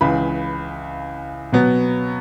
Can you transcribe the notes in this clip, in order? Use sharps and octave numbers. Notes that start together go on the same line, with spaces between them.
C#2 C#3 E3 B5
B2 F#3 B3